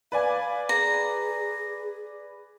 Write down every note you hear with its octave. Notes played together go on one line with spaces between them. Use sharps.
B4 D5 F5 G#5
G#4 A#5